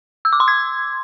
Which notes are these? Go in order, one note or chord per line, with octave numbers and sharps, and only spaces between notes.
E6
D6
C6
G#6